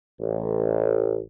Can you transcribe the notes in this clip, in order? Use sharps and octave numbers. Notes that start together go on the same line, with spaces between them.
A1